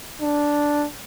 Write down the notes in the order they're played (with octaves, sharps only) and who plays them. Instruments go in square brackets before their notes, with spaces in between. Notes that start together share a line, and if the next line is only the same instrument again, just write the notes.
[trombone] D4